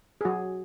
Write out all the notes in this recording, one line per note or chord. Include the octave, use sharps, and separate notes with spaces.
G#4
F#3 F#4